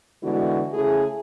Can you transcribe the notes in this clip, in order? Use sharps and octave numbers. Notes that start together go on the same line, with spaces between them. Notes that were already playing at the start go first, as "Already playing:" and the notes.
D3 E3 G#3 B3 E4 F#4
C#3 A3 E4 G#4